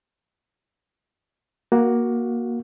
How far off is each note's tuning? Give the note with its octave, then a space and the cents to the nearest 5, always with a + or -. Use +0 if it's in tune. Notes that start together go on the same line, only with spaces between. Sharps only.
A#3 +15 F#4 +0